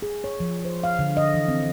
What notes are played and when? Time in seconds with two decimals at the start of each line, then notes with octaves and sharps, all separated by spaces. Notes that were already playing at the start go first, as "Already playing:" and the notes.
0.02 G#4
0.24 C#5
0.40 F3
0.65 C5
0.84 F5
0.99 D3
1.17 D#5
1.34 E3
1.48 C4